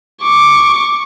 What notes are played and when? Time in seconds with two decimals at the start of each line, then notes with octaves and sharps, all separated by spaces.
0.23 C#6 D6